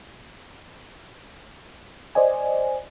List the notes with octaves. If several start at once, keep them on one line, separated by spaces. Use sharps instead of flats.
C5 D5 D#5 G#5